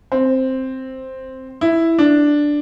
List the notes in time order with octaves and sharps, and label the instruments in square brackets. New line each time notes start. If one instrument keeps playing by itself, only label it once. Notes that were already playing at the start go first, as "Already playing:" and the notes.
[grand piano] C4
E4
D4